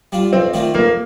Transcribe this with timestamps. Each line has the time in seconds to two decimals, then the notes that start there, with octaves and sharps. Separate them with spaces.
0.12 G3 D4 F4
0.33 F2 C4
0.54 D#3 A3 D4 F4
0.74 F2 A#3